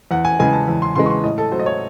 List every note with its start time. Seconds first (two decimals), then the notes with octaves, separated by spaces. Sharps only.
0.11 E2 F#5
0.25 G#5
0.39 C#3 E3 G#3 G#5
0.53 A5
0.68 E2
0.82 C6
0.95 C#3 E3 G#3 C6
1.06 C#6
1.10 C6
1.23 A2 D#5
1.38 A4
1.51 F#3 A3 C5
1.60 D#5
1.66 C#5